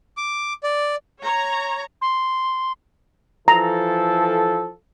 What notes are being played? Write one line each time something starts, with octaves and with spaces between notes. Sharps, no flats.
D6
D5
C#5 A#5
C6
E3 F3 A4 A#5